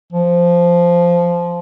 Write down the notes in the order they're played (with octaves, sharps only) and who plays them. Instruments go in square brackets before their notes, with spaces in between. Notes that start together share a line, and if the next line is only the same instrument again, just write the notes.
[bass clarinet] F3